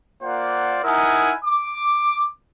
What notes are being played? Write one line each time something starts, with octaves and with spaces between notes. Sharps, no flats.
A#3 F4 C5 D5 F#5
D#4 E4 A#4 F#5 G#5 D#6
D6